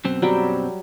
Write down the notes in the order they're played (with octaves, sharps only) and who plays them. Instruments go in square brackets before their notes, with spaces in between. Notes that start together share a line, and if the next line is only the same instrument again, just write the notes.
[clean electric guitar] F#2 B2 C4
[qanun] F#3 G3 G5